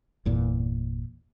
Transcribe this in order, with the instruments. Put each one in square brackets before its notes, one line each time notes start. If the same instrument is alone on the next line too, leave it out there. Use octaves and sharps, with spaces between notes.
[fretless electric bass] G1 E2 A#2